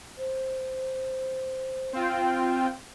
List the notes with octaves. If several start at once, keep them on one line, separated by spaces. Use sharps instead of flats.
C5
C4 F4 G5